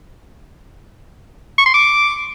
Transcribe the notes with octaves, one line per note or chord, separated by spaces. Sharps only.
C#6
C6
D6